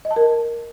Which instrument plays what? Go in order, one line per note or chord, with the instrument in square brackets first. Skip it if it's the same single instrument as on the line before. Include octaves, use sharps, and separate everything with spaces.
[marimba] D#5
A5
A#4